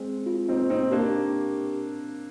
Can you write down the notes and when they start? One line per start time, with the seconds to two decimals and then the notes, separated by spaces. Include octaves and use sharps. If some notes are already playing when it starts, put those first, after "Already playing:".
Already playing: G#3 C4
0.26 F4
0.48 C4 D#4
0.59 C5
0.70 C4 D#4
0.91 A#3 D4 G4